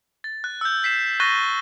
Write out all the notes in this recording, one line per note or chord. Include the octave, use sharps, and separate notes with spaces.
A6
F#6
E6 G6
G6 B6 C7 E7
C#6 F#6 A6 A#6 D#7 G7